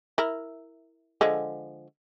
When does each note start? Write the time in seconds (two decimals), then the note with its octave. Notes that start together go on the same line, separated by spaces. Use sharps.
0.18 E4 A#4
1.21 D3 F3 G#3